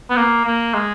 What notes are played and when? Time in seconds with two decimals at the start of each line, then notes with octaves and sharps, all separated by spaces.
0.10 B3
0.17 A#3
0.45 A#3
0.74 G#3